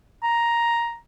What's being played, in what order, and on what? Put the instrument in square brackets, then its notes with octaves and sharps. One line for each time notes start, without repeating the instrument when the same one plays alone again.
[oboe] A#5